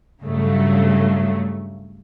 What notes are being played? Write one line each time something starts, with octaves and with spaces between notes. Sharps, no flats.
G2 C#3 F#3 A3